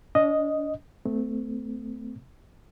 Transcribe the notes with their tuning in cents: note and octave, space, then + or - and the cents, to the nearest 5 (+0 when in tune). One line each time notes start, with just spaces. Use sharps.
D4 -35 D#5 +0
A3 +0 C4 -40